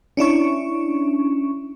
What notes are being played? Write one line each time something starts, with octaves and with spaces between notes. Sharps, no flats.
C#4 D4 E4 C#6